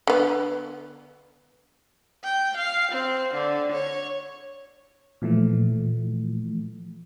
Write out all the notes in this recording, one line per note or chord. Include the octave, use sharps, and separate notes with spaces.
D3 B3
G5
F5
C4
D3
C#5
A#2 E3 F3 A3